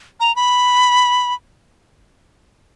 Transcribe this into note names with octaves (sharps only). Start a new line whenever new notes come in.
A#5
B5